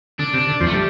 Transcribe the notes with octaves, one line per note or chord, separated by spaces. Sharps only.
D3 D4
C3
D3
F2 F3
A3
G3